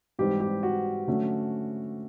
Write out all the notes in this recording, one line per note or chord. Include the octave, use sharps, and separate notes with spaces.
G#2 E3 G3 C4 D#4 G4
G4
F#4
D3 F#3 A3 C#4